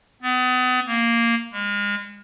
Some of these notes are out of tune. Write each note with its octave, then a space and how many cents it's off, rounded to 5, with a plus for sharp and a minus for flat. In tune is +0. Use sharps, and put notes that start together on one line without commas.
B3 +35
A#3 -5
G#3 -35